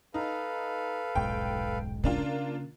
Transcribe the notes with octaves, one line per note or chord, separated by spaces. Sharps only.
D#4 A4 B4 F5
D#1 B1 G#2 G5
C#3 A#3 D4 F4